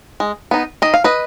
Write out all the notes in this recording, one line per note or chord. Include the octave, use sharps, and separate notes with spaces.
G#3
B3 D#4
D#3 D#5
F5
B4 D#5